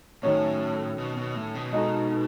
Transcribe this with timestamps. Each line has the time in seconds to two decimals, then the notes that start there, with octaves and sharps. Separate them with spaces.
0.23 A2 D#3 F#3 C#4
0.98 B2
1.17 B2
1.35 A2
1.54 B2
1.73 G#3 D#4 F#4 A4